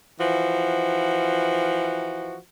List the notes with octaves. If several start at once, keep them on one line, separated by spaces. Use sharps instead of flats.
E3 F3 F#4